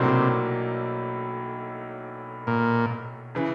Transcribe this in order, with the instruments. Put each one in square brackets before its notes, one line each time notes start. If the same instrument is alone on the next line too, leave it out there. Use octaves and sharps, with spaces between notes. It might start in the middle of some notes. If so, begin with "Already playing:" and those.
Already playing: [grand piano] B1 A2 F#3 A#3 D4 [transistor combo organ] C3
[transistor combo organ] A#2
[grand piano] C#3 E3